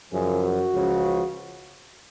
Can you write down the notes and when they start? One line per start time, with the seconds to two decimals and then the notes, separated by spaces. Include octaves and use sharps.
0.11 F#2 C#3 F3 G#4
0.43 F#4
0.73 C#2 C#3 F3